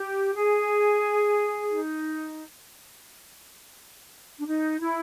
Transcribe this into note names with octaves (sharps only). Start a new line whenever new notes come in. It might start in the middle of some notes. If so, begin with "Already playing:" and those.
Already playing: G4
G#4
D#4
D4
D#4
E4